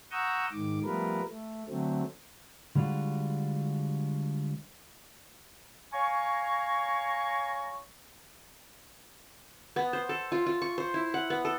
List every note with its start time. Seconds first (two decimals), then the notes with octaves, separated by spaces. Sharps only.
0.11 F#5 A#5 C#6 D#6 E6 G6
0.52 G#2 D#3 D6
0.84 F3 G3 A3 B3 A#4 B4
1.28 A3
1.69 D3 F#3 A3 C4
2.75 D3 G3 G#3 D4 F4 F#4
5.93 C#5 F5 G#5 A#5 C#6
9.76 B3
9.93 C5
10.09 A4
10.32 F4
10.46 F4
10.62 C#6
10.78 C5
10.94 E4
11.14 F#5
11.30 B3
11.45 A4